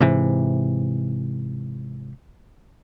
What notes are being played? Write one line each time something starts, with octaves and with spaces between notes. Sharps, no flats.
G#2 C3 E3